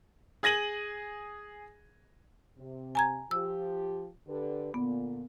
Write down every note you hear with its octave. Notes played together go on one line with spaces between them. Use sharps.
G#4 G#6 A#6 D#7 F#7
C3
G#5 A#5 G#6
F3 G4 E6
D3 G4 B4
A#2 D3 B3